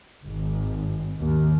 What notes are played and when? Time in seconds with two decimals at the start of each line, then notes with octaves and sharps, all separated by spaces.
0.25 G#1
1.19 D#2